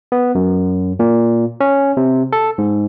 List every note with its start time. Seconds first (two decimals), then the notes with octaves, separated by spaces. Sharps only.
0.12 B3
0.35 F#2
0.99 A#2
1.60 C#4
1.97 C3
2.33 A4
2.58 G#2